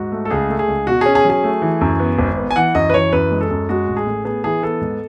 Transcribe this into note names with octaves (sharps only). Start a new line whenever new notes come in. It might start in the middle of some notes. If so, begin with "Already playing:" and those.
Already playing: G#2 F#4
A3
A4
C#2 G#4
A3
G#4
C#2
B2 F#4
C#4 G#4
G#4
F#3
G#4
A3
E3
F#2
B3
G#1
B3
G#5
E3 F#5
F#2 D#5
B4
E3 C#5
F#2 B4
G#3
A4
F#2
G#3 F#4
A1
G#4
A2
B3 G#4
E3 G#4
B3 A4
G#2